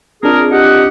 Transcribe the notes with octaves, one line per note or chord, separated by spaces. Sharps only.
C4 D4 F4 G#4 A#4
G4 D#5 F#5